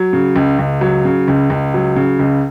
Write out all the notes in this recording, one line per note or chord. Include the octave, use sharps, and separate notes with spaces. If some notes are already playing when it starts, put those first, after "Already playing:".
Already playing: F#3
C#3
C#2
C#2
F#3
C#3
C#2
C#2
F#3
C#3
C#2